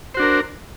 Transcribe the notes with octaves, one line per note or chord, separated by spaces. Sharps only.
D4 F#4 A#4 C5